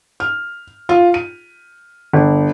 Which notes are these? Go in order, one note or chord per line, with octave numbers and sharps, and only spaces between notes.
F6
F4
D#7
G1